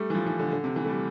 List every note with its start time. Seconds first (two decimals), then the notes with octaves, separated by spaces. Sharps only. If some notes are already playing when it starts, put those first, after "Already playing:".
Already playing: G3 A3
0.10 E3
0.15 F3
0.26 E3
0.39 D3
0.52 D3
0.64 C3
0.76 E3
0.85 A3
0.89 G3